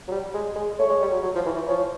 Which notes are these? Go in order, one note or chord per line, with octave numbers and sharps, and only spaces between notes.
F#3
G3
G#3
G#3
A3 C#5
G#3
G3
F#3
F#3
F3
E3
E3
F3 C#5